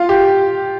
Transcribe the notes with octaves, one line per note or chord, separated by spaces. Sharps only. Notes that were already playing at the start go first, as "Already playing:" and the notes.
Already playing: F4
G4